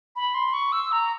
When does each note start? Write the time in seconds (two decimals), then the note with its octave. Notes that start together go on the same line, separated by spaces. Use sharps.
0.16 B5
0.34 C6
0.53 C#6
0.72 E6
0.92 A#5